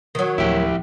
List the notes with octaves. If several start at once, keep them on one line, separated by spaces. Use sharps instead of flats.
D#3 F#3
D1 D2 F3 E4 G4